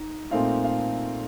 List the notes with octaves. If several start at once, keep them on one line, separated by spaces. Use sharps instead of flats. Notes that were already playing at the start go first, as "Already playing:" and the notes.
Already playing: D#4
A#2 A3 C4 D#4 F5
F5